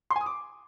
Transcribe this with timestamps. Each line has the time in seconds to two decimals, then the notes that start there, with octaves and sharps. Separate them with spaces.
0.11 C6
0.16 G#5
0.21 D#6
0.26 D6